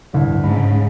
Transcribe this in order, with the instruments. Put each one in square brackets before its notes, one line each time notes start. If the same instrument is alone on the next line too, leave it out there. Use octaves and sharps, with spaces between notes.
[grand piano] A1 D2 G2
[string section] G#2 C#3 [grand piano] B5